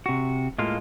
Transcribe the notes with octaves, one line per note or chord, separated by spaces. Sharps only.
C3 F#4
A2 G#3 A#3 F4